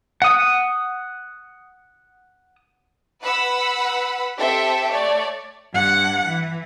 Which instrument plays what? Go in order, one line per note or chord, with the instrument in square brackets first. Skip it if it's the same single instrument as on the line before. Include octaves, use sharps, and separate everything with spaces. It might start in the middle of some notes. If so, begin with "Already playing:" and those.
[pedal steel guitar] F#5 D#6
[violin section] B4 F#5 B5 E6
C4 G4 A4 C5 E5 G5
A3 C#5 D5
[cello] G2 F#5
E3